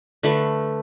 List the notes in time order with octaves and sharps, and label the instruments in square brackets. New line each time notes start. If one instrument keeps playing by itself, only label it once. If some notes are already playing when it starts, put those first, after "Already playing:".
[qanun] D3 A3 B4